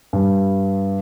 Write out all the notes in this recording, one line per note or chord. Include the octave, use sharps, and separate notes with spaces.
G2